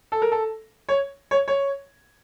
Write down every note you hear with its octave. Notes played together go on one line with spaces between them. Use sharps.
A4
A#4
A4
C#5
C#5
C#5